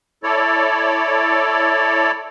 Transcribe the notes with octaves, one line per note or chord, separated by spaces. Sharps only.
E4 A4 C#5 D5